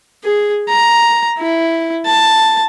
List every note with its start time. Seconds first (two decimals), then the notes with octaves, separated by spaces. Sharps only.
0.24 G#4
0.69 A#5
1.39 E4
2.06 A5